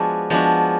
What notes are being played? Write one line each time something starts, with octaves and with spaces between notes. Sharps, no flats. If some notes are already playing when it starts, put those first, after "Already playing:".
Already playing: F3 G#3 B3 D4 F#4
F3 G#3 B3 D4 F#4